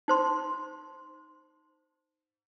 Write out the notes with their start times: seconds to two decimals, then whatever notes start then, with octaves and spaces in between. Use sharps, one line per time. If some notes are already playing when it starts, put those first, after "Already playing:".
0.08 D#4 C5 C6